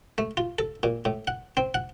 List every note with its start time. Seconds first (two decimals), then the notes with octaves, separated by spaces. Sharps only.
0.18 A3
0.37 F4
0.59 A4
0.83 A#2
1.05 A2
1.27 F#5
1.57 C4
1.74 F#5